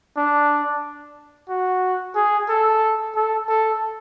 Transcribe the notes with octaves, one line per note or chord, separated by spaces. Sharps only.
D4
F#4
G#4
A4
A4
A4